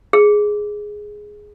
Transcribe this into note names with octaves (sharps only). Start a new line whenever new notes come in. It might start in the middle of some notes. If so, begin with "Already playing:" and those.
G#4